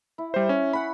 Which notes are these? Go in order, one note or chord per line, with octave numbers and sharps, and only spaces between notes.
E4
G3 C5
C#4
C#4 C#5 F#5 B5